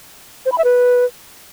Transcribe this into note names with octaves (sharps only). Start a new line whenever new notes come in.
C5
B5
E5
B4